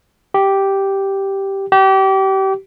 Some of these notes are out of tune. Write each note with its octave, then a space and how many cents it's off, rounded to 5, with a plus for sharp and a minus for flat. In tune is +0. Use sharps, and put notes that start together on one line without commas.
G4 -5
G4 -30